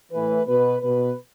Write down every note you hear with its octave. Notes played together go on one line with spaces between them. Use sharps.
A2 E3 B4
B2 B4
B2 B4